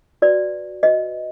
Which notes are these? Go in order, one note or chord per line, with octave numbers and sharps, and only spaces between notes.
F#4 B4 D5
F#4 B4 D#5